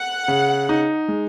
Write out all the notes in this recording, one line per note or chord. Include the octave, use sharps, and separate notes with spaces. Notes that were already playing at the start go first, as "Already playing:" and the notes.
Already playing: F#5
C#3
D#4
G#3